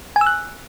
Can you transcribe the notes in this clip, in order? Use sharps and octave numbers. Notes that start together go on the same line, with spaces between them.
G#5
E6
F#6